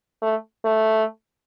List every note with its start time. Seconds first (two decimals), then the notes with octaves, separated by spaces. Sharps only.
0.22 A3
0.65 A3